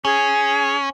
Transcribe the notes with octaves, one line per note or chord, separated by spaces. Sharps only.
C#4 G#4